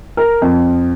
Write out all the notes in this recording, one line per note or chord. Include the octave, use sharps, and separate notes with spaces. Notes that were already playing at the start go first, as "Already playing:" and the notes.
A#4
F2